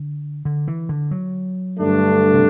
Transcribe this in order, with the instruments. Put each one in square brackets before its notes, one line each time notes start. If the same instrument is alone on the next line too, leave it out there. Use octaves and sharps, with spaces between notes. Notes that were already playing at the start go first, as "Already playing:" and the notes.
Already playing: [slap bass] D3
D3
E3
D3
F#3
[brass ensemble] G2 D3 A3 D4
[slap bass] C3